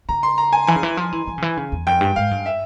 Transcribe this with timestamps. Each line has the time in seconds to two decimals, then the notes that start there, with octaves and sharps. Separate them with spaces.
0.09 C#3 A#5
0.23 C6
0.38 A#5
0.53 G#5
0.67 E3 G#5
0.76 C#3
0.83 E3
0.97 F3
1.12 E3
1.28 E3
1.38 C#3
1.42 E3
1.57 C#3
1.72 E2
1.87 F2 G5
2.01 G2
2.16 G#2 F5
2.31 G2
2.46 E5